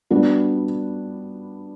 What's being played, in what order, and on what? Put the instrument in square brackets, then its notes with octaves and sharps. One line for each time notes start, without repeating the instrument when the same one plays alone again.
[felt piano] G3 B3 D4 F#4